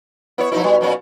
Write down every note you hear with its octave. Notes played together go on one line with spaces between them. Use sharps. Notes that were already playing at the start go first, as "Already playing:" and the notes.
B3 E4 C#5
B2 F3 D#4 E4
B2 G3
F#2 A#2 C#4